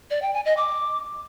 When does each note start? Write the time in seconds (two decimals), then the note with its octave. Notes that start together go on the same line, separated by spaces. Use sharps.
0.10 D5
0.22 G5
0.34 G#5
0.45 D#5
0.57 D6